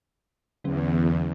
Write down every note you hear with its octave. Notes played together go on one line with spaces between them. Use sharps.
E2 D3 F#3 C#4